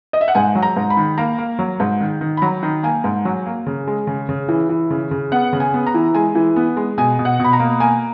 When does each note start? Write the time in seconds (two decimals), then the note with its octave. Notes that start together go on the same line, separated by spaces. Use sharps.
0.13 D#5
0.21 E5
0.28 F#5
0.35 G#2 G#5
0.55 F#3
0.62 A#5
0.76 G#2
0.90 B5
0.97 D#3
1.18 A#3 A#5
1.38 A#3
1.59 F#3
1.80 G#2
2.01 D#3
2.21 D#3
2.37 B5
2.42 F#3 A#5
2.63 D#3
2.83 A#3 G#5
3.04 G#2
3.25 F#3
3.46 A#3
3.66 C#3
3.88 G#3
4.07 C#3
4.29 C#3
4.48 E3
4.69 E3
4.90 C#3
5.11 C#3
5.32 B3 F#5
5.53 C#3
5.60 G#5
5.74 B3
5.87 A#5
5.94 E3
6.15 G#3 G#5
6.35 E3
6.56 B3
6.77 G#3
6.98 B2 G#5
7.19 B2
7.25 F#5
7.39 B2 B5
7.53 A#5
7.59 A#3
7.80 A#3 G#5